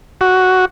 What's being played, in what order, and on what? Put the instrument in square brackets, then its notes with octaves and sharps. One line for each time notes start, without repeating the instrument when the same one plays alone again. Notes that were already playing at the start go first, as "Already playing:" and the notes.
[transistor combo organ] F#4